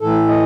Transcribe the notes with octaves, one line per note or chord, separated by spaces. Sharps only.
A2 E3 A4
D#5